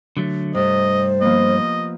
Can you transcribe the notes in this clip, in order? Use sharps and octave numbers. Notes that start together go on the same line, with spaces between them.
D3 F#3 A3
G2 C3 A3 C5 D#5
F3 A#3 B3 D#5